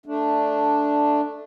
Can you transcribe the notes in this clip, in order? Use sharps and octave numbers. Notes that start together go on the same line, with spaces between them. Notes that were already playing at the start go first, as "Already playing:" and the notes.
A3 D4